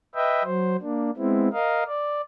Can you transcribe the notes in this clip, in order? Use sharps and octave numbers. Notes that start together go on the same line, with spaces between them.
B4 D#5 E5 G5
F#3 C5
A#3 D4
G#3 B3 C4 E4
A#4 D#5 F5
D5